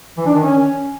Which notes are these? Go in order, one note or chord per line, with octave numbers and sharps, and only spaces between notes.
E3
D4
D#3
C#4